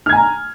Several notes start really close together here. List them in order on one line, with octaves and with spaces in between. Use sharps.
F6 G#6 G#5 A#5